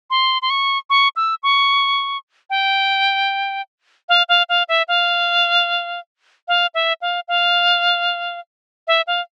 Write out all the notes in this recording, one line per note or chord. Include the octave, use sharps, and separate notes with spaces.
C6
C6
C#6
C#6
E6
C#6
G5
F5
F5
F5
E5
F5
F5
E5
F5
F5
E5
F5